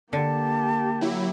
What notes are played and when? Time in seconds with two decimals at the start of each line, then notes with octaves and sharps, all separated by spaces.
0.13 D3 A#3 G4 A5
1.01 F#3 E4